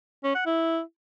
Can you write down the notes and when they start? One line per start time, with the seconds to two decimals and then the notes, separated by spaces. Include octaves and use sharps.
0.24 C#4
0.35 F#5
0.46 E4